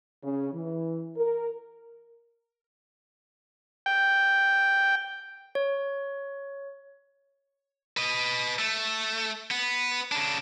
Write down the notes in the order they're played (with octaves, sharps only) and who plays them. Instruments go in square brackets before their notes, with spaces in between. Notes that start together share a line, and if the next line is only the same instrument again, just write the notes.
[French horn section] C#3
E3
A#4
[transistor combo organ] G5
[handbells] C#5
[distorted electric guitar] B4 D#5
A3
B3
C#3 D4